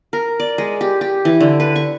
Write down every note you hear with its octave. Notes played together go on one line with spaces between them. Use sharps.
A#4
D5
G#3
G4
G4
E3
D3
B4
C#6